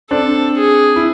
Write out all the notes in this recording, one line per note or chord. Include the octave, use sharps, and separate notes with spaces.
C4 D4 A4
G#4
E4